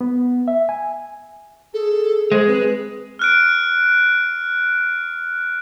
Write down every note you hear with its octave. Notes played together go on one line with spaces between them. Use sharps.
B3
E5
G#5
G#4 A4
G#3 C5
C4 B4
F6 F#6 D7